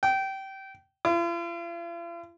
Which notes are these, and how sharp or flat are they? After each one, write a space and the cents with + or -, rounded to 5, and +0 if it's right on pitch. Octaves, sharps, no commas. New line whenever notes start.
G5 -20
F4 -45